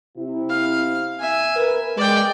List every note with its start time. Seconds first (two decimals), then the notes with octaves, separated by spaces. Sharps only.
0.18 C3 E4
0.49 F5
1.20 E5 G#5
1.57 A#4 B4
1.97 G#3 D5 G5